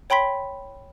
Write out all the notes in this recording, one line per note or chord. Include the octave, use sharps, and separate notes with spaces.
C#5 G5 B5 C6 B6